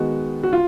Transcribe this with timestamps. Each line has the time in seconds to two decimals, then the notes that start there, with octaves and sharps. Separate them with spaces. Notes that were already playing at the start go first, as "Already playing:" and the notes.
Already playing: D#3 G#3 B3 F#4
0.43 F#4
0.53 F4